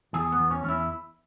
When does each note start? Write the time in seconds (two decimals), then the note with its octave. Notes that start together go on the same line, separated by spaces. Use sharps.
0.13 E2 G#4
0.32 B3
0.38 E2
0.51 C#4
0.63 E2 C#4
0.69 E4